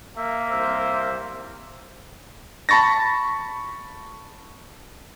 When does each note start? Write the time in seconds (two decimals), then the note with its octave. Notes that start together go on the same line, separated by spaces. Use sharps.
0.17 A#3 E5
0.51 C2 C5 E5
2.69 A5 B5 C#6 A6 A#6